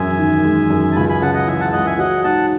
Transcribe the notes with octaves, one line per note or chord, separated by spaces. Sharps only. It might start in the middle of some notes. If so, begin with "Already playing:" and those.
Already playing: E1 F#2 E5 G#5
D#3
G#3
F#2
A5
C#2 G#5 B5
G#5 B5
C#3 F#5 A5
D#5 F#5
E3 E5 G#5
F#5 A5
C#2 D#5 F#5
E5 G#5
F#3 D#5 F#5
G#2 F#5 A5